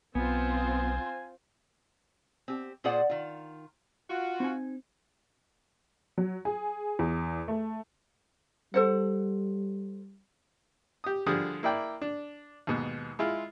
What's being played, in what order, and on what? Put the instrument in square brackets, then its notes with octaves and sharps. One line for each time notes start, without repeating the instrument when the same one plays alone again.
[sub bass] B1 [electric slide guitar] B3 [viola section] C4 F4 C5 [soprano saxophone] G#5
[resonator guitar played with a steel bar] C4 G4
A#2 F4 G#4 C5 D5 F#5
D#3 F4
[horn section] F4 F#4
[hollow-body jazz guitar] C4 D#4 G#5
[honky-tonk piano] F#3
G#4
E2
A3
[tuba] G3 [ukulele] A4 C5 F#5
[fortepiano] G4 D#6
D3 F3 G3 G#4 D#6
A#3 E4 D5 G5
D4
D#2 G#2 B2
G#3 E4 F4